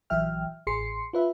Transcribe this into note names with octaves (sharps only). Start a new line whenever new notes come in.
A#1 E3 F#3 E5 G5 F6
A1 G#4 C6 C7 C#7
F4 B4 E5